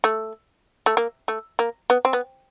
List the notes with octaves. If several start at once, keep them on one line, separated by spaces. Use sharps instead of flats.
A3
A3
A#3
A3
A#3
B3
C4
B3